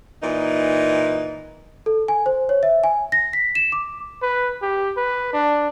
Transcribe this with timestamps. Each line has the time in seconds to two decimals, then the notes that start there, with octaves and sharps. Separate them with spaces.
0.22 A#2 E3 D#4
1.86 A4
2.08 G#5
2.26 C5
2.49 C#5
2.63 E5
2.84 G#5
3.12 A#6
3.33 B6
3.55 E7
3.72 D6
4.22 B4
4.62 G4
4.96 B4
5.33 D4